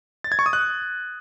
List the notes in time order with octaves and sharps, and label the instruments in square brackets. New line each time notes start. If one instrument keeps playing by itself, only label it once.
[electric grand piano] A6
G#6
C#6
D#6
F#6